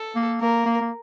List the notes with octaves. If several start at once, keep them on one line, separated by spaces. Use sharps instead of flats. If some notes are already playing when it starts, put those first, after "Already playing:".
Already playing: A4
A#3
A#3 A#4
A#3
A#3